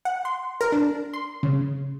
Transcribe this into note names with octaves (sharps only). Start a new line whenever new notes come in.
F#5
C6
A#4
D4
C6
C#3